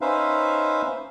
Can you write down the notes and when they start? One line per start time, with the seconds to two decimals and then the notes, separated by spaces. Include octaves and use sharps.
0.01 C#4 D#4 B4 C5 E5 F5